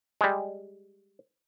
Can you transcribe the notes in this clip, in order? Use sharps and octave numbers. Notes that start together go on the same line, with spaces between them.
G3 G#3